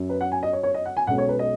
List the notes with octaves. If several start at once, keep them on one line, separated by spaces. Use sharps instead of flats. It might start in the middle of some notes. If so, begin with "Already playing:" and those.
Already playing: F#2 F#3 C#4
B4
F#5
G#5
D#5
C#5
C#5
D#5
F#5
G#5
B1 B2 G#3 C#4 F#5
C#5
B4
D#5